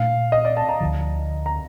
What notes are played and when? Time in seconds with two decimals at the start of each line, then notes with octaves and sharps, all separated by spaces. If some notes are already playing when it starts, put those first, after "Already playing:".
Already playing: A#2 A3 D4 F5
0.32 D#5
0.45 D5
0.57 A5
0.69 A#5
0.81 D2 D3 F3
1.46 A#5